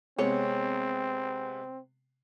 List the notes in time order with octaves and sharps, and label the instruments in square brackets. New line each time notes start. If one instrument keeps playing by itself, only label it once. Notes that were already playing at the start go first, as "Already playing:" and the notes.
[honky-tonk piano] C3 G#3 B3 [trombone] C4 [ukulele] C#5